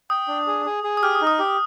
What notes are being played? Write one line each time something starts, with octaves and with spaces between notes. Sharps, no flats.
G5 D#6
D4
G#4
G#4
G#4
D#6
G4 F6
D#6
D#4
D#6
G4